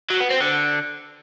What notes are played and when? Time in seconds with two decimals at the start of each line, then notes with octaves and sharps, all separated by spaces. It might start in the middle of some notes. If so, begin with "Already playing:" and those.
0.10 F#3
0.20 B3
0.31 C4
0.41 D3